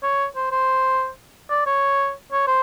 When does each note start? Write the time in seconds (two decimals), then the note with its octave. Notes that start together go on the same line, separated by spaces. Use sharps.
0.03 C#5
0.36 C5
0.51 C5
1.50 D5
1.66 C#5
2.32 C#5
2.48 C5